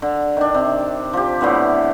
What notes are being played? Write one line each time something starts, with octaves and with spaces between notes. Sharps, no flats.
D3
D#3 D4
C3
F3 G4
A2 D3 E3 B3